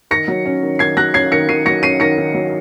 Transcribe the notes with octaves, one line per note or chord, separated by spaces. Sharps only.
D#3 A#6 C#7
F#3
C#4
D#3
D#3 G#6 C7
F#3 F#6 A#6
C#4 G#6 C7
D#3 A#6 C#7
D#3 C7 D#7
F#3 A#6 C#7
C#4 C7 D#7
D#3 A#6 C#7
D#3
F#3